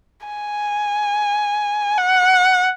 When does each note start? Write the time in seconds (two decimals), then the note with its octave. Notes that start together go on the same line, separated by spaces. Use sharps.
0.27 G#5
1.98 F#5